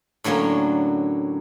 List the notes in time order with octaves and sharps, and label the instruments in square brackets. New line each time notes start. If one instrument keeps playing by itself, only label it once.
[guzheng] A2 D3 F#3 A#3 C#4